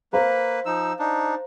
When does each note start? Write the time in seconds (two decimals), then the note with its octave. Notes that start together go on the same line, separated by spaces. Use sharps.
0.13 A#3 B4 C5 F5 A#5
0.66 F3 D#4 E6
0.99 D4 D#4